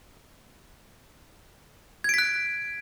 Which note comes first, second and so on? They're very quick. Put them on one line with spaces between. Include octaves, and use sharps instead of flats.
G#6 D7 B6 F#6